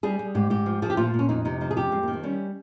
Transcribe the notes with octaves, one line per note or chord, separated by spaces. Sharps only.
G3 G#4
G3
G#2 G4
G#2 G4
F3
F3 G#4
G4
A#2 F4
A#2
C#4
F2 D#4
C3 D#4
F3 D#4
G#4
F2 G4
F2 G#3
D#3 A#3
C4
G3 C#4